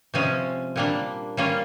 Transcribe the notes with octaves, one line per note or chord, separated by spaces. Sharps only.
C3 F3 G#3 C#4
A#2 G3 A#3 D4
G3 A#3 C#4 F4